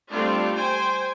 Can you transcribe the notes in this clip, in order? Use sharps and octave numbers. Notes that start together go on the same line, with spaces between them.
G3 A3 C4 D4 F4
C5 G5 G#5